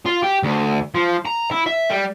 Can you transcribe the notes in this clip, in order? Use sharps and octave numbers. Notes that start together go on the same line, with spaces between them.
F4
G4
D2
F3
A#5
E4
E5
G3